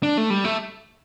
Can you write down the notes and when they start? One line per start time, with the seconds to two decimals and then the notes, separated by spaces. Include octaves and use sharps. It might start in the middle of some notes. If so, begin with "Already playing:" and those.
0.03 D4
0.18 A3
0.30 G3
0.44 A3